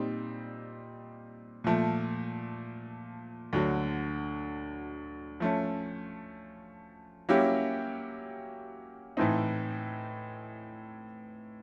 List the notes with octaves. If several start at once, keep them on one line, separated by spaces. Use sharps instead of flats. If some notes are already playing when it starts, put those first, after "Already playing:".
Already playing: A#2 G3 C4 D#4
A#2 F3 A3
D2 D3 F#3
F3 A3 C#4
F#3 A#3 C#4 E4 G4
A2 E3 A3 C4 D#4